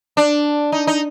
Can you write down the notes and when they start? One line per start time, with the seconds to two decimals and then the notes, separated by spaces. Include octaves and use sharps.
0.17 D4
0.72 D#4
0.87 D#4